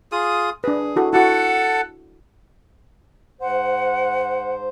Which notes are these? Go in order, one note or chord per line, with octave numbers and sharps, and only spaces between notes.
F4 G#4 D#6
D4 G#4 B4
E4 F#4 A4
E4 F#4 A4 F#5 A5
G#2 C5 F#5